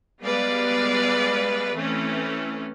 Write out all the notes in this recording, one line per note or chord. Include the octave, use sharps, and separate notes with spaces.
G3 G#3 B3 B4 D5 F5
E3 A3 C4 C#4